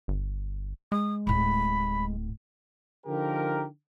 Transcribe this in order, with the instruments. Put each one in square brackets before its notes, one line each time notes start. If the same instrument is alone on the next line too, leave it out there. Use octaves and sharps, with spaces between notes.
[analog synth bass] G1
[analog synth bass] G#3 [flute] D#6
[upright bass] D1 A2 [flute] B5
[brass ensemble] D3 F3 D#4 G4 A#4